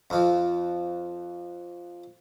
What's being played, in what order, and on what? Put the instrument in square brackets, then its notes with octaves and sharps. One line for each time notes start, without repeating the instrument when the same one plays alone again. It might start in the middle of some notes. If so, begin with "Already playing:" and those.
[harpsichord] F2 F3